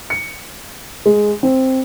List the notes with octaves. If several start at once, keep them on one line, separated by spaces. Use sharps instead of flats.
C#7
G#3
C4